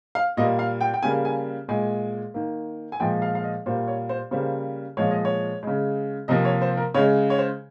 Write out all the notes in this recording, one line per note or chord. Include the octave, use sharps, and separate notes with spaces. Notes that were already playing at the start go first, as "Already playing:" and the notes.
F5
A#2 G3 A#3 D#5
F5
G5
G5
C#3 G3 A#3 G#5
G#5
A#2 G#3 G#5
D#3 A#3
G#5
A#2 F3 G#3 G5
F5
F5
D#5
A#2 G3 A#3 C5
C#5
C5
C#3 G3 A#3 C5
A#2 F3 G#3 C#5
D#5
C#5
C#3 G#3
C3 F3 A#3 D#5
C#5
C5
A#4
C#3 G#3 C#5
C#5
C5